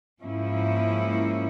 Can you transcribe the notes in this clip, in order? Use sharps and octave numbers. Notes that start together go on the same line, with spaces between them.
G#2 F3 A#3 C#4 E4